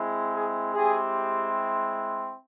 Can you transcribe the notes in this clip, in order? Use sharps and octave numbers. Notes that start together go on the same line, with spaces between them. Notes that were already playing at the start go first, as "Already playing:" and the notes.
Already playing: G#3 C4 E4
G#4
G#3 C4 E4 G4 G#4